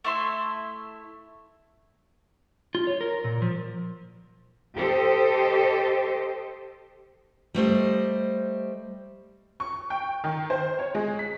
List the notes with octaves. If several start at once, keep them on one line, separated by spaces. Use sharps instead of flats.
A3 E4 E5 C6
F4
C#5
A#4
A#2
F3
G4 A4 C5 D#5
G3 A3 C5 D#5
C#6
G5
D#3
C5
C#5
G#3
B6